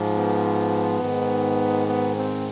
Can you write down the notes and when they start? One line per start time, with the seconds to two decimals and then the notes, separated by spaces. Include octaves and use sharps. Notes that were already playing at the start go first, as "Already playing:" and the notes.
Already playing: G#2 F3
0.14 B3
1.00 G#2 D#3
1.87 B3
2.15 C4